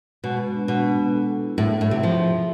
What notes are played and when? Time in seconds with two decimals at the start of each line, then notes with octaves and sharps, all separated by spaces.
0.24 B2 G#3
0.38 B3
0.53 D4
0.68 B2 D4
0.84 B3
0.98 D4
1.14 A4
1.28 A4
1.44 E4
1.58 A2 E5
1.73 E5
1.81 A2
1.88 C3 E5
2.03 F3 G#4
2.18 F4
2.32 F4